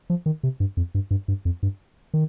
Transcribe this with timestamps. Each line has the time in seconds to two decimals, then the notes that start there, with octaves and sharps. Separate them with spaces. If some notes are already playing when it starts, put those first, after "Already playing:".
0.10 F3
0.26 D#3
0.43 C3
0.60 G2
0.77 F2
0.95 G2
1.11 G2
1.28 G2
1.45 F2
1.63 G2
2.14 D#3